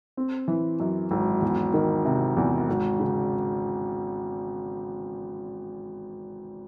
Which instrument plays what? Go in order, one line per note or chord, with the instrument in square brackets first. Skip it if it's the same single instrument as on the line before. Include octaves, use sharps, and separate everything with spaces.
[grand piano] C4
E3
F#2
G#1
E2
D#3
C3
E2
G#1
C#3